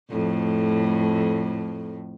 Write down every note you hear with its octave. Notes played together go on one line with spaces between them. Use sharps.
F2 A2